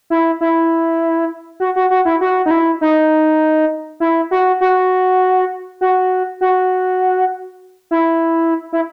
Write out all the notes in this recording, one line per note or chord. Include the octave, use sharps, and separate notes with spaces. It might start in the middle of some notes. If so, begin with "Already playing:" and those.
E4
E4
F#4
F#4
F#4
E4
F#4
D#4
E4
D#4
E4
F#4
F#4
F#4
F#4
E4
E4